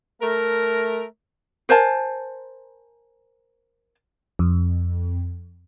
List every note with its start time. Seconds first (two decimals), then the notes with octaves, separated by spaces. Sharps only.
0.21 A3 A#4
1.69 A#4 C5 G#5 A5
4.39 F2